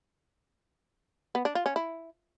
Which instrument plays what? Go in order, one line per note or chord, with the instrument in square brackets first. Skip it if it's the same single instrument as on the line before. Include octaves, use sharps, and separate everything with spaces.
[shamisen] B3
D4
F4
C#4
E4